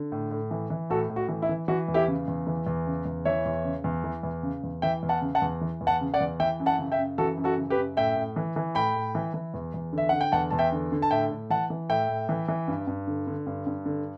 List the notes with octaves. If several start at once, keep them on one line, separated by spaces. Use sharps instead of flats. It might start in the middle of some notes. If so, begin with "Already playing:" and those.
Already playing: D3
A2
A2
E3
E3
A2 F#4 A4
A2
F#4
E3
E4
E3
E3 F#4
E2
E4 G4
C#3
E2
E3
E2
C#3
E2
E3 C#5 E5
E2
C#3
E2
E3
E2
C#3
E2
E3 E5 G5
E2
F#5 A5
C#3
F#5 A5
E2
E3
E2
F#5 A5
C#3
D5 F#5
E2
E3 E5 G5
F#2
F#5 A5
C#3
E5 G5
F#2
E3 F#4 A4
F#2
F#4 A4
C#3
G4 B4
F#2
A2 E5 G5
A2
E3
E3
A2 G5 B5
A2
E3
E3
E2
E2
D3 E5
D3 F#5
G5
E2 F#5 A5
E2 A5
E5 G5
D3
D3
A5
A2 E5 G5
A2
E3 F#5 A5
E3
A2 E5 G5
A2
E3
E3
G2
G2
D3
D3
G2
G2
D3